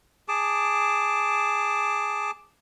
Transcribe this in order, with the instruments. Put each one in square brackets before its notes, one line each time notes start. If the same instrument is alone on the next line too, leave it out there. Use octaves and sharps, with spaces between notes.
[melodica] G#4 A5 D6